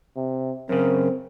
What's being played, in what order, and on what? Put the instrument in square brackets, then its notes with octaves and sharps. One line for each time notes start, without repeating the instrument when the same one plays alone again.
[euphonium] C3
[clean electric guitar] F#2 C#3 [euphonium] C4 [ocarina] A#4